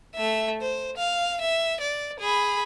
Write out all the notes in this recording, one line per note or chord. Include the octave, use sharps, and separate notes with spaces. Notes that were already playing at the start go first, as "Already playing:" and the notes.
A3 E5
C5
F5
E5
D5
G#4 B5